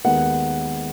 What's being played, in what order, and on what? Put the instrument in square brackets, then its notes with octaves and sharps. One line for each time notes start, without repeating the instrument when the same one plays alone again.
[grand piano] D#2 D#3 G#3 B3 F#5